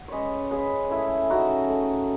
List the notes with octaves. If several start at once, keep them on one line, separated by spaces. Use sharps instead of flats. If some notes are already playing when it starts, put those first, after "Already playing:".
Already playing: F#5
G#3 C#4 B4 C#5 D#5
C#3 G#4 B4
E3 A3 E4 G#4
C#3 D#4 F#4
A3